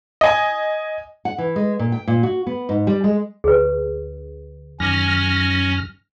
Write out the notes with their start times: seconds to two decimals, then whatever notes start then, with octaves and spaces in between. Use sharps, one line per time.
0.21 D#5 G#5
1.25 F#5
1.38 E3
1.56 G#3
1.79 A#2
1.92 G5
2.08 A#2
2.23 F#4
2.47 B3
2.69 G#2
2.87 G3
3.04 G#3
3.44 D2 D3 G#4 B4
4.80 F#2 D#3 C#4 F6 A#6